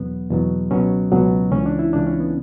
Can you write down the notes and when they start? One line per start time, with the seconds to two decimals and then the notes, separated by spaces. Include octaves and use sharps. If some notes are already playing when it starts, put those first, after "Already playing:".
Already playing: E2 B2 F#3 B3
0.30 E2 B2 F#3
0.71 C#2 B2 F#3 C#4
1.12 C#2 B2 F#3
1.52 C#2 C#3 E3 C#4
1.66 D4
1.79 E4
1.93 C#2 C#3 E3 D4
2.06 C#4
2.20 B3